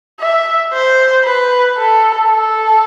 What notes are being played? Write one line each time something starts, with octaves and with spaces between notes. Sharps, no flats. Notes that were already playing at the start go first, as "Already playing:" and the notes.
E5
C5
B4
A4
A4